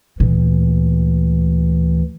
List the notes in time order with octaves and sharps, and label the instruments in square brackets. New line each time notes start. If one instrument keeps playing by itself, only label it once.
[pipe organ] D2 E3 [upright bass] A#2